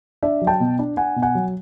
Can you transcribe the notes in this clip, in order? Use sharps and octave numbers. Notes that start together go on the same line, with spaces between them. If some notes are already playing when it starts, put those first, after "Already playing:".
D4 D5 E5
F#3
G5 A5
B2
D4
D4 F#5 G#5
B2
F#5 G#5
F#3